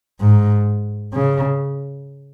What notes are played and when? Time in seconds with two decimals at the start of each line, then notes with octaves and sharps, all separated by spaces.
0.20 G#2
1.13 C#3